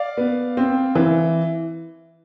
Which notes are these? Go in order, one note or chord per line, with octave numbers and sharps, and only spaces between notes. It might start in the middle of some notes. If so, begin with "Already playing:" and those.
Already playing: D5 F5
B3
C4
E3